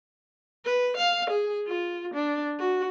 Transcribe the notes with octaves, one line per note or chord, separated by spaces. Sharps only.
B4
F5
G#4
F4
D4
F#4